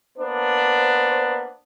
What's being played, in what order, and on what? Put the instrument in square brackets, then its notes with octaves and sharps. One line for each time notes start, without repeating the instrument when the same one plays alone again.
[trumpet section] A#3 B3 D4 [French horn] C5